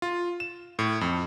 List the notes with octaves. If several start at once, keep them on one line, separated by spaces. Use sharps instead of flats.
F4
E7
A2
F2